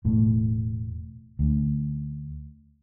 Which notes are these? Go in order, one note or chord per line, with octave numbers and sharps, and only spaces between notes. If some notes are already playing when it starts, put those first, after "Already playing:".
E1 A2
D2